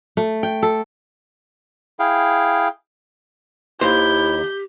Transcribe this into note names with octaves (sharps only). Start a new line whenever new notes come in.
A3
G5
A4
E4 G#4 F5 G5
D#2 E4 G4 C5 G6